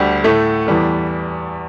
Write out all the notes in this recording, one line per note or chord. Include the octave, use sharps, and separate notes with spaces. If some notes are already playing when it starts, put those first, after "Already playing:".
Already playing: D2 D3 G3 G4
A2 A3 A4
E2 E3 G3 A4